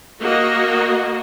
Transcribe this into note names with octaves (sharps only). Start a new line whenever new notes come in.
A#3 F#4 D#5